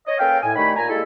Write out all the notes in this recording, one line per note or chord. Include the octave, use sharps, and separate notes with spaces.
C#5 D#5
A#3 C#4 A4 B4 F5 G5
A2 G#5
D#3 G3 A3 D#4 C#5 B5
A#2 G#5 A#5
G3 G#3 A#3 E4 A4